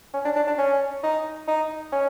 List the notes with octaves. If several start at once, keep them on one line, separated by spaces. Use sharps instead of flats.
C#4
D4
D4
D4
C#4
D#4
D#4
C#4